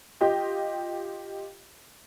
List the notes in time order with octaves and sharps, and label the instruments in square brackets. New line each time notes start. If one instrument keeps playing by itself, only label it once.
[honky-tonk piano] F4 G4 D#5